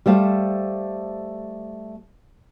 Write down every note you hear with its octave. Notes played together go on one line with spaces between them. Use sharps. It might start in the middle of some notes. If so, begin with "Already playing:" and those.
G3 A3 C5 F5